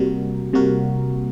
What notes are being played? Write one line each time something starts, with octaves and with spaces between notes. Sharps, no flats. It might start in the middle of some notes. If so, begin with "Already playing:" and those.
Already playing: C3 G3 A#3 F#4 A#4
C3 G3 A#3 F#4 A#4